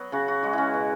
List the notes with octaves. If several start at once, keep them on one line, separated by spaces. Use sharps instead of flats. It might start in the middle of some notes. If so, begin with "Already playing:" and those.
Already playing: F#3 B3
C#3 F#4
F#4
G#3 F#4
C#4 E4
B2